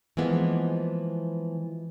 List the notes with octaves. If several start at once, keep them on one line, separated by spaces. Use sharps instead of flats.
E3 F3 G#3 A#3 B3